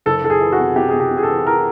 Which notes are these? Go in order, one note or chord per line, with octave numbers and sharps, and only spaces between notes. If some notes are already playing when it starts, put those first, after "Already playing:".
F#1 A4
F#1 A4
G#4
E3
F#4
C3
C3 G4
C3 G#4
G4
C3
G#4
A4
E3
E3 A#4